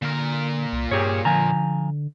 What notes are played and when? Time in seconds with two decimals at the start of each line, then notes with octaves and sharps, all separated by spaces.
0.02 A#2 D3 A#4
0.72 C2
0.91 G2 G4 G#4 C#5
1.25 D3 F3 G#5 A#5